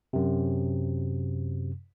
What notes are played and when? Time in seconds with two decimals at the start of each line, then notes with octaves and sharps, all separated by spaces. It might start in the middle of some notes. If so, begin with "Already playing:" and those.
0.13 F#2 C3